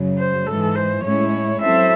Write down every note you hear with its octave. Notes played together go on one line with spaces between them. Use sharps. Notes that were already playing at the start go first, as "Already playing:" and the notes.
Already playing: F#2 C#3 F#3
C5
G#2 E3 G#3 A4
C5
A2 G#3 C#4 E4 C#5
F#3 C4 E4 A4 C5 E5